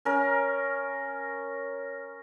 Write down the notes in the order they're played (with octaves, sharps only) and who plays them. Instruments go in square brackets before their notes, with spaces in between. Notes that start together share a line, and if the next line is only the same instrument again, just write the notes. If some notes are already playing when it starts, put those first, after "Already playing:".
[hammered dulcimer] C#4 A#4